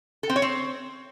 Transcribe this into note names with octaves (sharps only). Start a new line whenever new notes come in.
A4
C4
C#5
C4